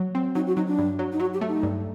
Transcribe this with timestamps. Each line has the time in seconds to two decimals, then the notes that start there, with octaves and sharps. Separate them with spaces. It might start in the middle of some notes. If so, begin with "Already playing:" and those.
Already playing: F#3
0.15 C4
0.35 F#3 D#4
0.47 F#4
0.57 F#3 D#4
0.67 D4
0.79 G2
0.99 F#3
1.12 D#4
1.20 F#3 F#4
1.34 G4
1.41 A3
1.48 D#4
1.63 G2